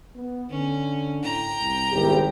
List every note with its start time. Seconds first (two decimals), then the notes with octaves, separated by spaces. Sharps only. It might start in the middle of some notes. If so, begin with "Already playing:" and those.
0.16 B3
0.50 D3 C#4
1.23 A2 G5 A#5
1.61 C2
1.92 G#1 E2 G4